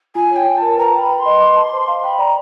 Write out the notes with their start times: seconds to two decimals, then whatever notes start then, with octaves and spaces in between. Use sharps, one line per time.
0.15 F4 G#5
0.31 C#5
0.36 G5
0.47 F4
0.57 A#4 A5
0.77 B4 A#5
0.94 G5
0.99 B5
1.09 B4
1.20 C6
1.25 D#5
1.40 D6
1.56 A5
1.72 C5
1.88 F5
2.04 G5 B5
2.19 D5 A#5